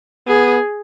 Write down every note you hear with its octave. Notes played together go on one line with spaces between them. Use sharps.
B3 G#4